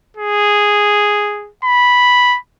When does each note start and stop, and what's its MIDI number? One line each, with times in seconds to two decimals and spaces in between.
0.17 1.51 68
1.64 2.37 83